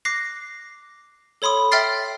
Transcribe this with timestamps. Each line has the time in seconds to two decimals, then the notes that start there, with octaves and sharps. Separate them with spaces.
0.05 D6 F#6 A#6 C7
1.42 A4 C#5 B5 C6 D#6
1.72 E5 G5 C6 F6 A6 C7